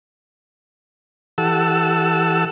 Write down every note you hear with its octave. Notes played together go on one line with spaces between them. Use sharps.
E3 G4 A4 F#5 A5 E6